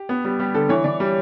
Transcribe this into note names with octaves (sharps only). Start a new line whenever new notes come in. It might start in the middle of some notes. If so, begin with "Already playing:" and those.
Already playing: G4
B3
G3
G3 G4
D3 A4
E3 C#5
E3 D5
G3